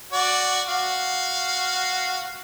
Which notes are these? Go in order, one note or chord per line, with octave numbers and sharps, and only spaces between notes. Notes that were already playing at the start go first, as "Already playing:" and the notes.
F#4 D5
F#4 F5